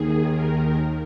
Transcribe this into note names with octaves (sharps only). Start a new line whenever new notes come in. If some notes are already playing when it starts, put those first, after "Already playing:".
Already playing: D#2 D#3 G#4
A#4